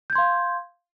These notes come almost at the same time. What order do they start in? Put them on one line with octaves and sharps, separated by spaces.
G6 G#6 C6 F5